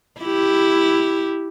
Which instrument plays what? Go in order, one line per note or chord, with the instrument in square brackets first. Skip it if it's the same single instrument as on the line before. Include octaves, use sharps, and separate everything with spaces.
[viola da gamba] E4 G4